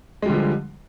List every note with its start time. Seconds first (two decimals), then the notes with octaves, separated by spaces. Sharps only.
0.22 G#3
0.26 G3
0.30 D3
0.33 F3